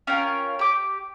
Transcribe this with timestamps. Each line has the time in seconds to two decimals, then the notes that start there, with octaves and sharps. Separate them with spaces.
0.07 C#4 F4 A#4 G5
0.59 G4 D6